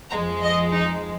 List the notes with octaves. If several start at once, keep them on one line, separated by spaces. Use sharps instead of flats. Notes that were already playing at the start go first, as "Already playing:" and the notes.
F2 F3 G#3 A#5
D#5
D#4